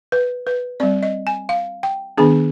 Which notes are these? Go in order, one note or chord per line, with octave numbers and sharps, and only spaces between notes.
B4
B4
G3 C4 D5
D#5
G#5
F5
G5
D#3 B3 D4 G#4